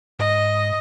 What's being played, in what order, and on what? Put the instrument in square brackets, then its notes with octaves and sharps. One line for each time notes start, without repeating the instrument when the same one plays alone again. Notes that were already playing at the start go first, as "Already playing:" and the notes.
[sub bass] G#2 [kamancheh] D#5